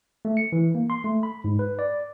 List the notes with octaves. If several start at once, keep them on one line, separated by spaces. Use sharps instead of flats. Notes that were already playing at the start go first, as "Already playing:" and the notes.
A3
C#7
E3
A#3
C6
A3
B5
G#2
B4
D5